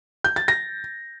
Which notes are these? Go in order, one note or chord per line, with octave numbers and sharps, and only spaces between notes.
G6
A6
A#6